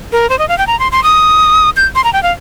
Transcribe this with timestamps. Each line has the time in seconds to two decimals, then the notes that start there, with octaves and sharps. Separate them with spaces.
0.12 A#4
0.30 C5
0.39 D#5
0.49 F5
0.58 G5
0.67 A#5
0.80 C6
0.92 C6
1.04 D#6
1.77 G6
1.95 C6
2.04 A#5
2.13 G5
2.23 F5